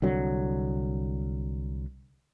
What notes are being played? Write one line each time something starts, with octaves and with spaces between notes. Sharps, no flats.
C2 D3 F#3